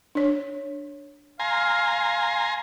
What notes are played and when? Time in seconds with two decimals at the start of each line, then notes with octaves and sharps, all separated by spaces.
0.15 D4 C#5
1.40 F5 G#5 A#5 C6